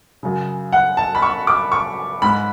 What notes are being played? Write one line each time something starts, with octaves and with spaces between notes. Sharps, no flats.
F#2 C#3
F#5
A5
B5
C#6
D6
C#6
G#2 B5